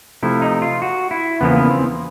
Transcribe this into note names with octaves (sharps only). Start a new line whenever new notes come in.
C3 F3 A3 E4
D#4
F4
F#4
E4
E2 C#3 F3 A#3 B3
B3
C4